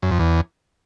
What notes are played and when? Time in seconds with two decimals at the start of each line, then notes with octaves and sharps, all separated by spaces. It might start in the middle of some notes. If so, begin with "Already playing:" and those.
0.02 F#2
0.11 F2
0.19 E2